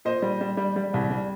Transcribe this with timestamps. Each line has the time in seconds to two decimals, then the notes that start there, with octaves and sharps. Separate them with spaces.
0.05 A#2 C5 D#5
0.22 G3
0.41 G3
0.57 G3
0.76 G3
0.94 C2
1.10 G3